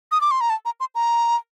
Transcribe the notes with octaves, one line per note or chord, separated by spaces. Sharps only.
D#6
D6
C6
A#5
A5
A#5
C6
A#5